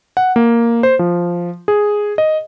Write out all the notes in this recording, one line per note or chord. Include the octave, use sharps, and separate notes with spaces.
F#5
A#3
C5
F3
G#4
D#5